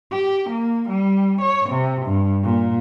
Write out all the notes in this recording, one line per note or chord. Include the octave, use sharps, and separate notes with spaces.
G4
A#3
G3
C#5
C3
G2
A#2